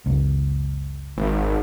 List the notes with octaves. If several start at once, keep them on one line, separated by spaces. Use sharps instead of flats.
F#1 C#2
G#1